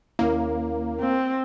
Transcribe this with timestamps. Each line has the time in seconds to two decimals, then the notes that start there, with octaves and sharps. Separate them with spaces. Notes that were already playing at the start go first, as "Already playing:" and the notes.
0.19 D#2 A#3 C#4 E4
1.00 C4